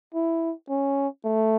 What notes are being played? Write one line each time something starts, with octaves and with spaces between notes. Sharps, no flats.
E4
C#4
A3